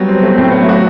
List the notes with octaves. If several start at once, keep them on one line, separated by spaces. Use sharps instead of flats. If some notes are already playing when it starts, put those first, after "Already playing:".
Already playing: F#3 G3 B3
C4
A3
A2 C4
F#3 B3
A3
F#4